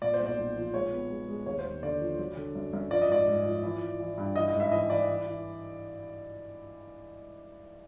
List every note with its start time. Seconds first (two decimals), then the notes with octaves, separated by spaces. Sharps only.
0.02 A#2 D5
0.14 C5
0.20 B1
0.26 D5
0.38 B1
0.56 F3
0.74 G#3 C#5
0.92 B3
1.10 G#3
1.28 G#3
1.46 D#2 C#5
1.59 C5
1.65 D#2
1.83 D3 D5
2.01 F3
2.19 F#3
2.37 D3
2.55 F#2
2.73 F#2
2.91 F3 D5
3.01 D#5
3.09 G#2 D5
3.27 G#2
3.45 F3
3.63 E3
3.81 E3
4.00 E3
4.17 G2
4.36 E3 D#5
4.48 D#5
4.53 G#2
4.60 E5
4.72 E3 D#5
4.90 E3 D5
5.08 E3
5.26 E3